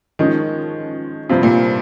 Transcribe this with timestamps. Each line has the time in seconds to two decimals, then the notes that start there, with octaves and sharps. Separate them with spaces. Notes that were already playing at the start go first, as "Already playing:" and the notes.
0.19 D#3 F3 G#3 C#4
1.29 G2 C3 F3 C4 F4
1.43 A#2